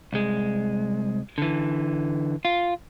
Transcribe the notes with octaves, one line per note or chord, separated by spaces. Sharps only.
C2 G#3
D3 E3
F4